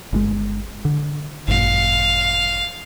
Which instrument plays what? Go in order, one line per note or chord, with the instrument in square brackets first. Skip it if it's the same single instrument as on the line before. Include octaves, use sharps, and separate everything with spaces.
[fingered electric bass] G1 C3 G#3
D3
[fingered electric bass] G#1 F#2 A#2 [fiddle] F5